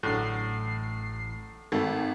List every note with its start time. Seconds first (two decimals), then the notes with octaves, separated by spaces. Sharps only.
0.03 A1 A2 D3 F#3 C7
1.72 G#1 A3